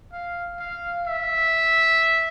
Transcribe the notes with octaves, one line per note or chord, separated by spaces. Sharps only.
F5
F5
E5